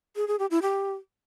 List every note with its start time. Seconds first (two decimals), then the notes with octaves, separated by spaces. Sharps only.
0.16 G#4
0.28 G#4
0.39 G4
0.51 E4
0.62 G4